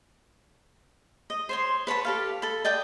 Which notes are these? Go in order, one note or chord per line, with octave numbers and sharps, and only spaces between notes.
D#5
C5 C#5 C6
B4 C#5 A5 B5
G4 A4 F5
A4 B5
D5 D#5 G5 D6